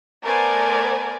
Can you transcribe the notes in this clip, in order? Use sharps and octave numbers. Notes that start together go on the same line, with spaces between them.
A3 B3 A#4 C5 D5 G#5